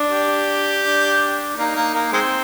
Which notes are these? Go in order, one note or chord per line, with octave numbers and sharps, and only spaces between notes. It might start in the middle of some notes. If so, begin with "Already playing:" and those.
Already playing: D4
G4
D4
A#3 D#4
A#3
A#3
G#3 C4